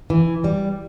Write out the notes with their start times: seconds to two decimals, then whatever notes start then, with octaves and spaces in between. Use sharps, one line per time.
0.10 E3
0.44 G3